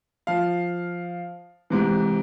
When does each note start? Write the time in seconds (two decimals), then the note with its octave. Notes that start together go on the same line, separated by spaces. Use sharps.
0.27 F3 F5
1.70 G#2 C3 E3